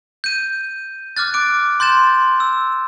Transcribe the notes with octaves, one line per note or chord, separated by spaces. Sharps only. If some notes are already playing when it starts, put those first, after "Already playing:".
G6 D#7
D6 F6 F#6 A6
D6 D7
C6 G6 A6 E7
E6